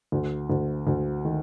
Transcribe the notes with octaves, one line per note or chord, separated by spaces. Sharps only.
D2
D2
D2
D#3